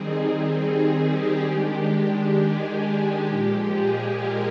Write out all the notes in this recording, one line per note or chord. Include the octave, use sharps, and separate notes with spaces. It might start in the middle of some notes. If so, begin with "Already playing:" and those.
Already playing: D#3 G3 C4 D#4 G#4
G#4
G4
D#3 G#3 D4
G#4
A#2 F3 G#3 G4
G#4
A#4